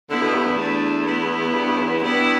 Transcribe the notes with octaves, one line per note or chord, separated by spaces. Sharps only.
D3 B3 E4
B2
G2
E2
A3 D4
B3 E4
G2
G2
E2
G2 B3 E4